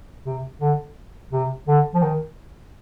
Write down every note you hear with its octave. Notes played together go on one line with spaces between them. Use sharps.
C3
D3
C3
D3
F3
D#3